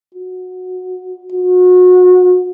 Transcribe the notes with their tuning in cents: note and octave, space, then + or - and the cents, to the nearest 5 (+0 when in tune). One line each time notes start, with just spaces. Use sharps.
F#4 -15
F#4 -30